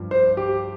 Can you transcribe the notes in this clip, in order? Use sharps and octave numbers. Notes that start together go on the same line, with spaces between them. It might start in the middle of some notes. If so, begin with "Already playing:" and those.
Already playing: G2 F3
C5
G4